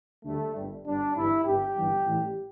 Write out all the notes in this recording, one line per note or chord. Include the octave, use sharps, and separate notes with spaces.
D2 D3 G3 A3
G1 G2 D3 G3
G1 G2 G3 D4
G1 G2 E3 E4
G1 G2 G3 G4
G1 G2 E3 G3
A1 A2 E3 G3